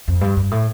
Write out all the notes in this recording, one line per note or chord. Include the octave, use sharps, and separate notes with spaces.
F2
G2
G2
A2